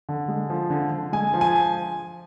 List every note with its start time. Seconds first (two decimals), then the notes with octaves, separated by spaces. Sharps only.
0.09 D3
0.28 G#3
0.50 F3
0.70 D3
0.92 D3
1.13 G#3 G#5
1.34 F3
1.41 G#5